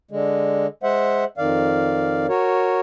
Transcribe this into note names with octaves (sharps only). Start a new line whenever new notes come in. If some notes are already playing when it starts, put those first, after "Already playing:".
D3 G#3
G#3 C5 E5 F#5
F2 D#3 D5 F5
F#4 A#4 C#5